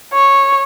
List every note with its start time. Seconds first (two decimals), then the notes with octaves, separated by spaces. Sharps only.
0.13 C#5